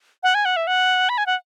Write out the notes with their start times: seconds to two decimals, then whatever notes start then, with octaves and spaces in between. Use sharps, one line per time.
0.23 F#5
0.35 G#5
0.45 F#5
0.57 E5
0.67 F#5
1.09 B5
1.18 G#5
1.26 F#5